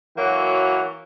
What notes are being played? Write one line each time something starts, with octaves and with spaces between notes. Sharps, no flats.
E3 F#3 A#3 F#4 C#5